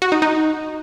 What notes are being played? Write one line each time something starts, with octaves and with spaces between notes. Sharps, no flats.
F#4
D#4
D#4